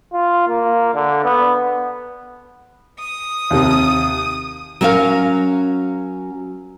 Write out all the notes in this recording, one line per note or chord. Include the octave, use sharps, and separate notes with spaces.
F4
A#3
D3
B3
D#6
D#2 C3
F#3 C#4 A#4 C#5 F5